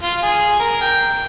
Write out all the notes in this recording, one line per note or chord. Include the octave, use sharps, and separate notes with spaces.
F4
G#4
A#4
G5